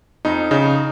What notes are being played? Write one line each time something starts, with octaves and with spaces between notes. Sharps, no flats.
F2 D#4
C#3 D#4